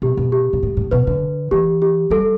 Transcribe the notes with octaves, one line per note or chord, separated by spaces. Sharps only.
B2 G4
B2
G4
B2
A2
A2
B2 B4
D3
E3 G4
G4
G3 A4